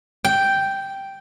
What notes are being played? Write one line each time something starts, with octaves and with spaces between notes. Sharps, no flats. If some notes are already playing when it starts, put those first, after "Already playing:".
G5